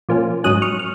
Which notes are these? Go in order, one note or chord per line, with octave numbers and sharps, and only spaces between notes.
A#2 F3 A#3 C#4
G#2 F#3 C#4 D#6 F#6
C#6 F6
F6